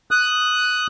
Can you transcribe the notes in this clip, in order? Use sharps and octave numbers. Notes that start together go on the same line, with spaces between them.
D#6 F#6